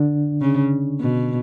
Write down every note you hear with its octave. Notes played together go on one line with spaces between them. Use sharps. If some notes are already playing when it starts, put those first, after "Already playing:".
Already playing: D3 D4
C#3
B2